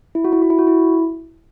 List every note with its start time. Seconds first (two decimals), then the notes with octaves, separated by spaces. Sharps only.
0.15 E4
0.24 F#4
0.33 E4
0.42 F#4
0.50 E4
0.59 F#4
0.67 E4